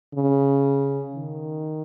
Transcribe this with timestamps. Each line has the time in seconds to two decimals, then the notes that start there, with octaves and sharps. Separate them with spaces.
0.14 C#3
1.15 D#3